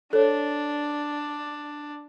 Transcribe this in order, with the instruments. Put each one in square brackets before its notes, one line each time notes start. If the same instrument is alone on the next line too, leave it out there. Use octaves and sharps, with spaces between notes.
[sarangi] D4 [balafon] A4 C#5